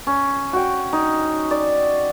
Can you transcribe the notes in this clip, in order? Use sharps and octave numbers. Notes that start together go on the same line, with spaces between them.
C#4
F#4 G5
D#4
D5